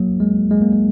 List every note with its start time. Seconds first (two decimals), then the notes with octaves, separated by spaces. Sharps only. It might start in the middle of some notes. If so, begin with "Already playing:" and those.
Already playing: F#3 A#3
0.20 G#3
0.51 G#3
0.62 A#3
0.72 G#3